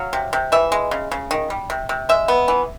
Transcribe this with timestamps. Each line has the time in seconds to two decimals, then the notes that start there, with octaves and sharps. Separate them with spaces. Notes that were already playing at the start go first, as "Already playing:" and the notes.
Already playing: F#3 F5
0.13 C3
0.33 C3
0.52 E3 E5
0.72 G#3
0.91 C#3
1.11 C#3
1.31 D#3
1.50 G3
1.70 C3
1.89 C3
2.09 G#3 E5
2.28 B3
2.48 E3